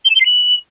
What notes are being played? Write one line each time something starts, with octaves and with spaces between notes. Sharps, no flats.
G7
E7
G7
C7
F#7